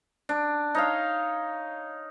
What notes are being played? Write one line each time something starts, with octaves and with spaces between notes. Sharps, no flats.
D4
D#4 C#5 F5